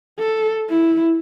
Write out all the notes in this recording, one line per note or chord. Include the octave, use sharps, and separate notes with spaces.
A4
E4